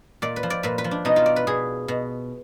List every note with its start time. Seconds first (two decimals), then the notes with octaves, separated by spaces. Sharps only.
0.22 A#2 D5
0.36 B4
0.43 F3
0.50 D5
0.63 A#2 B4
0.78 B4
0.84 F3
0.91 D4
1.05 B2 D#4
1.16 F4
1.26 D5
1.36 B4
1.47 B2 G#4
1.88 B2